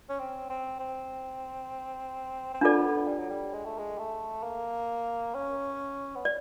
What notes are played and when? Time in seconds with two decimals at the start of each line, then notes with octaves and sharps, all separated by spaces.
0.09 C#4
0.19 C4
0.50 C4
0.79 C4
2.54 C4
2.61 B3 D4 F4 A4 D5
3.07 G3
3.19 F#3
3.30 G3
3.53 G#3
3.65 A3
3.78 G#3
3.99 A3
4.43 A#3
5.35 C#4
6.16 B3
6.25 D5